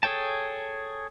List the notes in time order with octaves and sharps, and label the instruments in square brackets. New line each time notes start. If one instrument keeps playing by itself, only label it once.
[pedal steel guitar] G#4 A4 C#5 G5 A5